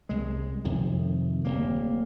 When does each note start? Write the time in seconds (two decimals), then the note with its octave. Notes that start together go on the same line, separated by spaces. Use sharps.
0.09 C2 G#3
0.65 F2 C3 D#3
1.45 D1 A#3